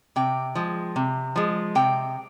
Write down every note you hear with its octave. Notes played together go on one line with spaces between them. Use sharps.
C3 G5
F3 G#3
C3
F3 G#3
C3 G5